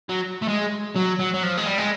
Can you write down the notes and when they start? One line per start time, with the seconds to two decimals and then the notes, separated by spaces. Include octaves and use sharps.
0.09 F#3
0.42 A3
0.48 G#3
0.96 F#3
1.19 F#3
1.34 F#3
1.43 F3
1.57 G#3
1.66 G3
1.78 G#3